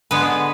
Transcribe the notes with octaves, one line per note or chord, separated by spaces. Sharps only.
D3 G#3 B3 B4